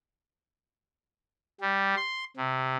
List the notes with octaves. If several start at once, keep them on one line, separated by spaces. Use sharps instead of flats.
G3
C6
C3